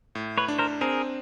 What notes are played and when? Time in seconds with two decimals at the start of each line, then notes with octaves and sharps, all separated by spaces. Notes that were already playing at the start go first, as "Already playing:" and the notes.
0.15 A2
0.38 B4 C#5
0.48 D4
0.58 A#4 C5
0.81 C4 G#4 A#4